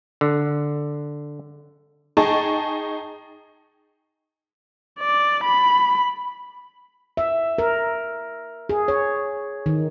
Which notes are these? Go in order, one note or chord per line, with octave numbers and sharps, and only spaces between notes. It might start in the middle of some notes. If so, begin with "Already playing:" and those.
D3
D#4 G#4 D#5 G5 A5 C#6
D5
B5
E5
A#4
G#4
C#5
D#3